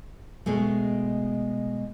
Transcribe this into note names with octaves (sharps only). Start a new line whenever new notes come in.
B2 G#3 A3